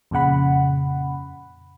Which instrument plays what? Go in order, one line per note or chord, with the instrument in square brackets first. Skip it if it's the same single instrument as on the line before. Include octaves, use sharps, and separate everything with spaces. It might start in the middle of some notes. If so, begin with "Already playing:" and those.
[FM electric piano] F2 A#2 C#3 F#5 B5